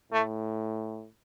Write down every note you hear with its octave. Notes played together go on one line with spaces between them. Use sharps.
A2 A3